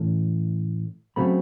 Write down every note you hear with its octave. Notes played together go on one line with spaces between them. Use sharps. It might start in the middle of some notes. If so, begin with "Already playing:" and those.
Already playing: A2 E3 A3 C#4
C#3 F#3 A3 C4 B5